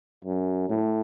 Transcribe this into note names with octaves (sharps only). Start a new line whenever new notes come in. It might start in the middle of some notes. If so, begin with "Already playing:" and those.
F#2
A2